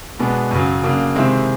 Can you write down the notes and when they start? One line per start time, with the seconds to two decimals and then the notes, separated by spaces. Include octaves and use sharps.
0.19 B2 G#3 B3 D4
0.51 F#2 C#3 F#3
0.83 C#3 F#3 A#3 D4
1.15 C3 D#3 G#3 C4 E4